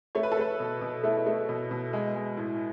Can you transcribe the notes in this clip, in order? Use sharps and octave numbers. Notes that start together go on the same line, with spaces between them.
A3 C#5
B4
A4
A3 B4
B2
B2
A3 E4
A3
B2
B2
G#3
G#3
A2